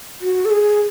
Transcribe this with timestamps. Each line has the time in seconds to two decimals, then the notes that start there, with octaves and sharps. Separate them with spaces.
0.22 F#4
0.45 A4
0.51 G#4